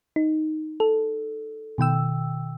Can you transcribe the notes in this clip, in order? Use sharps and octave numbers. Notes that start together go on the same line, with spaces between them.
D#4
A4
B2 D#3 G5 E6